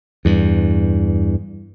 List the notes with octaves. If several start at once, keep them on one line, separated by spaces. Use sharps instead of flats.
E2 G2